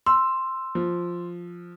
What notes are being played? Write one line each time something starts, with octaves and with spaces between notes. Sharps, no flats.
C6 E6
F3